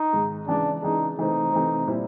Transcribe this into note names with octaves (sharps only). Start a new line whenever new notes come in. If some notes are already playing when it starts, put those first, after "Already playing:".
Already playing: D#4
G#2 D#3 G#3
C#3 E3 G#3 D4
C#3 E3 G#3 D#4
C3 E3 A3 C4 D#4
C3 E3 A3 C4
A#2 G3 C4 E4